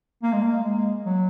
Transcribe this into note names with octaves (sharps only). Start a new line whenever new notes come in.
A#3
G#3
A#3
G#3
F#3